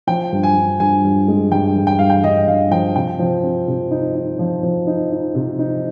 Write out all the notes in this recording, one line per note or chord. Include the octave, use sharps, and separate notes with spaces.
F3 G5
G2
G#5
G2
G2 G#5
G2
G#3
G2 G5
G2
G5
G2 F5
G5
G2 D#5
G2 F5
F3 G5
C3 G5
F3
C4
C3
D#4
D#4
F3
F3
D#4
D#4
C3
D#4